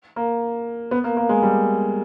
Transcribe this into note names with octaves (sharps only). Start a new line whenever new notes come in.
A#3
B3
A#3
A#3
G#3
G3